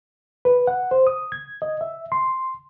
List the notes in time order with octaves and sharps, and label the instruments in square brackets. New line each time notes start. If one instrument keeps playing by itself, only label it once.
[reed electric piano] B4
F#5
C5
D#6
G#6
D#5
E5
C6